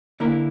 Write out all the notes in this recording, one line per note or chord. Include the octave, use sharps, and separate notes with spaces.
D3 A#3 E4 A#4